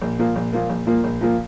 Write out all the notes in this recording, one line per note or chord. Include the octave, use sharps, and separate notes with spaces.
A#1
A#2 F3 A#3
A#1
A#2 F3 A#3
A#1
A#2 F3 A#3
A#1
A#2 F3 A#3